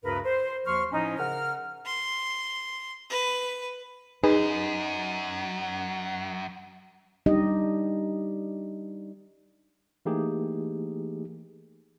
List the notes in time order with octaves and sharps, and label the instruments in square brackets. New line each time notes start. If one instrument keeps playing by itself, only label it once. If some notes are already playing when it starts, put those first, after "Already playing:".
[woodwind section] D2 G2 C#3 A#4 B4
C5
D#2 F3 C6 C#6 F6
A2 F3 C#4 D#4
C#3 A#4 F#5 F6
[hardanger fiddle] C6
B4
[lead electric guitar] F#2 [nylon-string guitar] D#4 [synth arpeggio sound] G#4 B4
[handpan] G3 D4 D#4 G4 D#5
[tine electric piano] E3 A3 A#3 D#4 G4 G#4